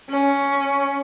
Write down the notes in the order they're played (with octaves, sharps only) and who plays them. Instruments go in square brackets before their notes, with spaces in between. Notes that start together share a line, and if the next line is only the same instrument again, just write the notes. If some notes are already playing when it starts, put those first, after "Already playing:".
[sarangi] C#4